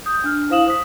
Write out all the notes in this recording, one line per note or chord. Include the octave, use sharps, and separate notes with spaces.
D#6 G6
D4 F6
E4 C5 F5 D#6 E7 F#7
C5 D#6 B6